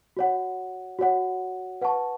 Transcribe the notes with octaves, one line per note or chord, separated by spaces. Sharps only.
F#4 C#5 F#5
F#4 C#5 F#5
B4 F#5 A5 C#6